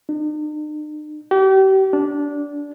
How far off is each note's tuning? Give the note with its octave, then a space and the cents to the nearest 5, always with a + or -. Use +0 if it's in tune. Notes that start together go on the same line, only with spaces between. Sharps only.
D#4 -45
G4 -35
D4 -15